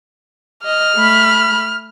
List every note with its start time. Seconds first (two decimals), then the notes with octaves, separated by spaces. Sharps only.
0.65 D#5 F6
0.96 A3 B5